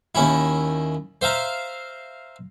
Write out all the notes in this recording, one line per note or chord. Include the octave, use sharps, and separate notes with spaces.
D#2 C#4 E4
C5 E5 F5 A#5